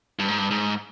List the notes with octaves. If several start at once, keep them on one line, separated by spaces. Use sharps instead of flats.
G2
G#2
G2
G#2